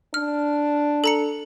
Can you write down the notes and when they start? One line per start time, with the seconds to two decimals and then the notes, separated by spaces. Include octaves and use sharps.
0.14 D4 F6
1.04 A4 A#5 C#7